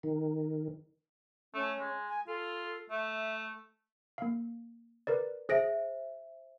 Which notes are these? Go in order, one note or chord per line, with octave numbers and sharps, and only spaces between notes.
D#3
A3 C#4
G#3
G#5
F4 A4
A3 E5
A#3 F5
A#4 B4 D5
G#4 C5 E5 A#6 D7